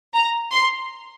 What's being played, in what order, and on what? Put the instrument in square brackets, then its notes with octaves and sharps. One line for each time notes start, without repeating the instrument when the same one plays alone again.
[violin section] A#5
C6